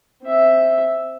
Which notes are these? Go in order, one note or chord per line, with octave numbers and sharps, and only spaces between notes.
C4 E5